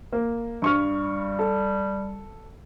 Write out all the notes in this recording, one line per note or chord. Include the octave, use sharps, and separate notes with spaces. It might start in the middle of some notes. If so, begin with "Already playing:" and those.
A#3
G2 G3 C#6 F6
A4